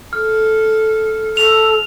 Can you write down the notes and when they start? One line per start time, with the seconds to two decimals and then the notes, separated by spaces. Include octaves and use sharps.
0.13 A4 F6
1.37 A4 F7